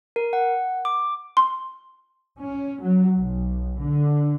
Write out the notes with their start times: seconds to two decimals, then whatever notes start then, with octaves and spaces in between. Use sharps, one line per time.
0.16 A#4
0.33 F#5
0.85 D6
1.37 C6
2.38 C#4
2.81 F#3
3.19 B1
3.81 D3